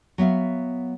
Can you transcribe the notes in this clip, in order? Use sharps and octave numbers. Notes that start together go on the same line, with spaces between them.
F#3 B3 E5 F5